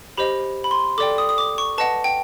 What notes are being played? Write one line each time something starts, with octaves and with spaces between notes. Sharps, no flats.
G4 C5 D#5 B5
B5
C6
A4 D5 G5 D6
D#6
D#6
D6
C#6
B4 D#5 F#5 A5
G5